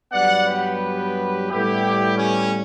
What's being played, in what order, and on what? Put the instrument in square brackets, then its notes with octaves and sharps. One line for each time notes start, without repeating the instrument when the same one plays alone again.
[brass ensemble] G2 F#3 B3 D5 F#5
G4 B4
A2 G3 B3 E4 G4
C#4